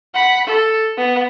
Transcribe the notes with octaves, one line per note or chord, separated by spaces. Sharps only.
F#5 B5
A4
B3